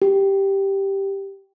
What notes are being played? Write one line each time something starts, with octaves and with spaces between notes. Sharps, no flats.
G4